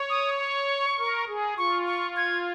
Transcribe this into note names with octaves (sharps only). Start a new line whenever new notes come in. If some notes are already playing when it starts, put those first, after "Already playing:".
Already playing: C#5
D#6
C#6
A#4
G#4
F4 C#6
C#6
G#6